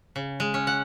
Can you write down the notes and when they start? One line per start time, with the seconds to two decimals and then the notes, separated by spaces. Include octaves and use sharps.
0.16 C#3
0.40 G#3
0.54 C#4
0.67 F#5